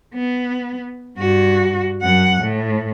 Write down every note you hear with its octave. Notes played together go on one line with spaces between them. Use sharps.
B3
G2 F#4
F#2 F#5
A2